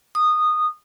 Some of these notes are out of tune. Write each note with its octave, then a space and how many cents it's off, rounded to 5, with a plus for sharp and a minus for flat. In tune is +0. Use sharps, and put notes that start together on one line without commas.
D#6 -15